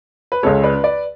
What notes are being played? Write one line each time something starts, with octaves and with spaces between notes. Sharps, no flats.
B4
C#2 C#3 G#3 A4 C#5
B4 D5
B4 D5